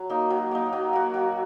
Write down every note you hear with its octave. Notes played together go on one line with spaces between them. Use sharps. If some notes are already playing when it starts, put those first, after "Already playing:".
Already playing: F#3
A#3 D#4
F#3
A#3 D#4
F#3
A#3 F#4
F#3